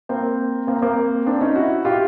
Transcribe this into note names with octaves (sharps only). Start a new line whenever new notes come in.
A#3 C4
A#3 C4
A#3 C4
C4 D4
C#4 D#4
E4 F#4
F4 G4